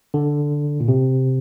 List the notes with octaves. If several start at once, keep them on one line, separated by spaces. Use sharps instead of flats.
D3
A#2
C3